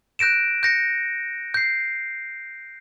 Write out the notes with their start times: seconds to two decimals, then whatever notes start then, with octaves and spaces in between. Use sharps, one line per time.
0.19 F#6 G6 A#6 D7 E7
0.63 G6 A#6 C#7
1.54 G6 C7